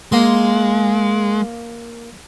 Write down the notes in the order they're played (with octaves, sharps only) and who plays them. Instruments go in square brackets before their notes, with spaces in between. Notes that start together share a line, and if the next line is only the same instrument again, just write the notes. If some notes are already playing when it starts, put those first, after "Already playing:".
[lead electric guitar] G#3 [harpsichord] A#3 C6